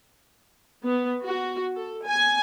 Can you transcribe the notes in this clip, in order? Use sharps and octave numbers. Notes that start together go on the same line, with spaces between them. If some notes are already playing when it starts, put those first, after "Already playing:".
B3
F#4
A4
G#5